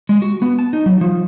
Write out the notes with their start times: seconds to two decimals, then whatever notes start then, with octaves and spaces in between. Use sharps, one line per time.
0.09 G#3
0.22 F#4
0.42 B3
0.59 A5
0.73 D#4
0.86 F#3
1.01 F3